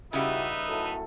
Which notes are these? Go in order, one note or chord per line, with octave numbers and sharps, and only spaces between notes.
C#3 G3 D#4 E4 F#4 G4 B4 E5
F#2 A2 A4